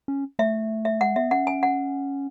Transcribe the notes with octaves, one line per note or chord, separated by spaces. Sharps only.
C#4
A3 E5
E5
G#3 F#5
B3 E5
C#4 F#5
G#5
F#5